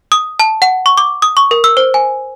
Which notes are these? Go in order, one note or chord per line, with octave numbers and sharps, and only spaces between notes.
D#6
A5
F#5
C#6
D6
D#6
C#6
A#4
E6
C5
G#5